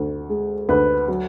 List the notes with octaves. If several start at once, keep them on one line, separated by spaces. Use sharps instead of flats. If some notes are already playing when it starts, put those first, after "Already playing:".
Already playing: D2
G#3
D2 B4
F#3